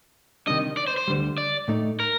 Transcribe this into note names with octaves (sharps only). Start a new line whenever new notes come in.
C3 D#3 G3 D4 D#5
D5
C5
C5
D2 D3 G3
D5
A2 A3 D#4
A#4